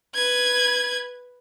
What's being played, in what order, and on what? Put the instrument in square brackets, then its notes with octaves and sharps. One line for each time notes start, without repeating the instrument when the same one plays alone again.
[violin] B4 G#6